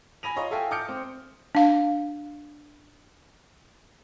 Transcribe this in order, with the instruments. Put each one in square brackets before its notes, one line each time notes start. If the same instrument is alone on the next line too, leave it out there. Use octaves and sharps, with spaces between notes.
[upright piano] G#5 B5 A#6 D#7 F7
F4 C#5 D#5 A#5
A4 E5 F5 G5 G#5
D6 D#6 F6 G6 C#7 D7
C4
[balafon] D4 F5